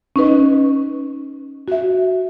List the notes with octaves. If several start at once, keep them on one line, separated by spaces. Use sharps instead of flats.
C#4 D#4 B4 D#5
F#4 E5